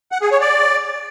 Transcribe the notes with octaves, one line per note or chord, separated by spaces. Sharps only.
F#5
G#4
C#5
D5